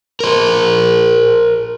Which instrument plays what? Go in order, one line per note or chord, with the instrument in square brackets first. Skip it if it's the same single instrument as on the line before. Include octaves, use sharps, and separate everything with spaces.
[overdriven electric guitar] A#4 C5